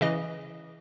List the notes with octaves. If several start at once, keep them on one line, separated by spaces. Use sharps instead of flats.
C#3 E3 D#5